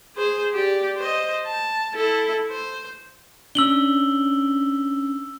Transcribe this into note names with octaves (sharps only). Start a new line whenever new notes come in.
G#4 C5
G4 D5
C5 D#5
A5
E4 A4
C5
C#4 D4 E6 F#7 G7